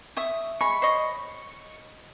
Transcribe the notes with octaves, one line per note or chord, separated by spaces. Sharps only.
E5 C#6 D#6
G#3 B5 C#6
C5 C#5 D#5